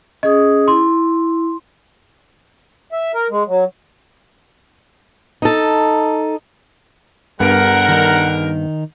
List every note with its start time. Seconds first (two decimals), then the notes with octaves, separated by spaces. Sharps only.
0.23 C#4 G#4 D#5 D#6
0.68 E4 C6
2.92 E5
3.14 A#4
3.30 G#3
3.47 F#3
5.42 D#4 A4
7.40 G2 D3 G3 B3 A#4 F#5
7.89 D#3 D#4